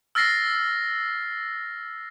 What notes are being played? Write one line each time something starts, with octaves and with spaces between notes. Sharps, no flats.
E6 F6 A6 A#6 C7